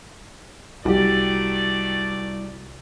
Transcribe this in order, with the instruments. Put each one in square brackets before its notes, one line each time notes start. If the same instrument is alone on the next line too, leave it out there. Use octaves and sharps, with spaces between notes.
[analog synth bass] C2 [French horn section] D#3 A3 D5 [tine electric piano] G3 E4 [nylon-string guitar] F#4 G4